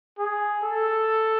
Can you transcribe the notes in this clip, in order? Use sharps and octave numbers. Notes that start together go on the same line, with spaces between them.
G#4
A4